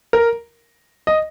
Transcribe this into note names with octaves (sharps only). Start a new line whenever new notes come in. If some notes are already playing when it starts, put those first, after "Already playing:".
A#4
D#5